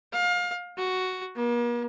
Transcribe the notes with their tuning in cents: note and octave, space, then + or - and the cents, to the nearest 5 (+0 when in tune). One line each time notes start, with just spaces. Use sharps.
F5 +30
F#4 +5
A#3 +45